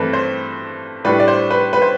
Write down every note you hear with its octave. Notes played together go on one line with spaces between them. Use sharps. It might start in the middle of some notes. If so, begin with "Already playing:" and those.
Already playing: G2 E3 A3 C4 B4
C5
A2 G3 D4 B4
D5
C5
B4
B4
C5